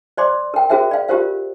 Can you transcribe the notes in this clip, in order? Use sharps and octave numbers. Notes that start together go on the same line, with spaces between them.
C5 D5 C6 D6
A#4 G5
F#4 G#4 A#4 C5 E5 G5
D5 F5
F4 G4 A#4 C5 F5